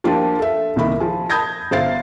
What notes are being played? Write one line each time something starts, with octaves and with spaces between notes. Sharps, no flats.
F3 A#3 D4 F4 G4
A4 E5
C2 A#2 D#3 A#3 E5 B5
F3 G#4
A5 B5 D#6 G6 G#6 A#6
G1 C5 E5 F5 A6 C7